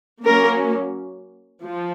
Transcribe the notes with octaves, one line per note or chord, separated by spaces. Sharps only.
F#3 A#3 C#4 A#4
F3